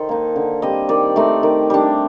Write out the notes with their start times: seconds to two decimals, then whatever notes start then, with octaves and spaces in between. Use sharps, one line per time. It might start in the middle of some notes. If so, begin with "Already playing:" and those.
Already playing: D#3 A4 C5
0.09 A#3 D#4
0.36 D3
0.62 G3 C4 D#5
0.89 D#3 D5
1.16 A3 C4 D#4 D5
1.43 D#3
1.70 G3 D4